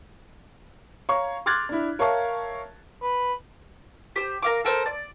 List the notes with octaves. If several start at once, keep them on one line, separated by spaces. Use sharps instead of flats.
C#5 F5 A#5 C#6
C6 D6 F6 F#6 G#6 A6
D4 E4
A#4 C#5 E5 F5 A5 C#6
B4
G4 C5
A#4 F5 D6
A4 A#4 C5
D5